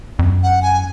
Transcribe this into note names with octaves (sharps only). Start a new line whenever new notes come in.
F2
F#2
F#5
G#5